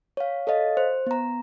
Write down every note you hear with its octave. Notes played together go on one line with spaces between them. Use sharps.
C#5 F5
A4 C#5 D#5 F5
C5
B3 A#5